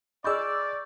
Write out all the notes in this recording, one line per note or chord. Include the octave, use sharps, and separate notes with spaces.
G#4 D5 D#5 B5 C#6 E6 F6 G6